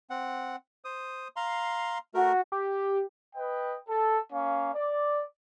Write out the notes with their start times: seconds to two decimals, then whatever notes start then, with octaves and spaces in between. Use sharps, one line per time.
0.10 C4 F#5
0.85 C5 D#6
1.36 F5 A#5 C6
2.14 A3 F#4 A#4
2.52 G4
3.36 B4 D#5 G5
3.89 A4
4.32 A#3 C#4 F5
4.75 D5